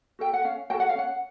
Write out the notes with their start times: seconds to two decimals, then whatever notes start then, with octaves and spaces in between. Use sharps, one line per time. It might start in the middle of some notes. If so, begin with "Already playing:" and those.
0.19 F#4 A4 G5
0.33 F#5
0.44 C#4 F5
0.70 F#4 A4 G5
0.80 F#5
0.89 F5
0.95 C#4 F#5